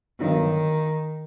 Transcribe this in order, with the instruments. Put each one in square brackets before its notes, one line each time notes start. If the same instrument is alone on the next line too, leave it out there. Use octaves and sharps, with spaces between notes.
[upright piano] G1 G2 F#3 [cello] D#3